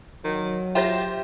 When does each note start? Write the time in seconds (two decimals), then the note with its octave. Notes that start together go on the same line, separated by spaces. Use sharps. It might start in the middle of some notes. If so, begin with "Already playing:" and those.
0.24 D#3 F#3
0.75 F4 G4 C5 E5 A#6